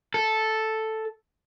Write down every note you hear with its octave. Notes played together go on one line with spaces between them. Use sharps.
A4